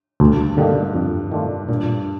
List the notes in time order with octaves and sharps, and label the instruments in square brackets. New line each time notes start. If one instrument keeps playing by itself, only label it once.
[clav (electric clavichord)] D2 [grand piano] G2
[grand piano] G2 [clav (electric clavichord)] D3 G3 A#3 D#4
[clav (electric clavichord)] F2
D#3 A3 D4 F4
[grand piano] G2 [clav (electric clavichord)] A#2